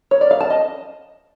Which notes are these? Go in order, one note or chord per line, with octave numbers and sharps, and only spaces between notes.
C#5
D5
F5
A5
D#5